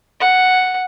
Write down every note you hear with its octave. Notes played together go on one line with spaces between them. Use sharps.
F#5